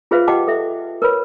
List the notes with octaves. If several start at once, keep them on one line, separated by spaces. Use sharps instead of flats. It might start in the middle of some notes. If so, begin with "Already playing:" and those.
F4 G#4 B4 C5 E5 F5
G4 D#5 F#5 G5 A5 D6
A4 E5
A#4 B4 C#5 B5